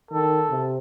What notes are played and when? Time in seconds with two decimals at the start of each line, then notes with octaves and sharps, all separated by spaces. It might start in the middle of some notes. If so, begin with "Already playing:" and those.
0.11 D#3 A4
0.50 C3